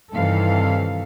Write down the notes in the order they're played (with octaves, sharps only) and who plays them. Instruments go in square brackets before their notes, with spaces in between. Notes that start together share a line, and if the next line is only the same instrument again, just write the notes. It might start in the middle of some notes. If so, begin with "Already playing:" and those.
[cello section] G2 C3 D#3 E3 A4 F5